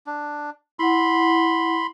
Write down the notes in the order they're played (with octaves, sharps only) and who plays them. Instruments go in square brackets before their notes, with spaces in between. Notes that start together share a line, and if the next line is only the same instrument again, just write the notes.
[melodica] D4
[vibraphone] E4 F#5 [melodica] B5 C6